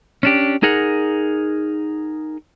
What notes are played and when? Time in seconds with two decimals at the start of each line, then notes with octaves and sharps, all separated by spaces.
0.23 C#4 D4 G4
0.63 D#4 G#4 A#4 F#5